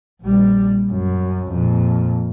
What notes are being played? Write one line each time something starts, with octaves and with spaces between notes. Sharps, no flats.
A#1 G3
F#2
F2 A#2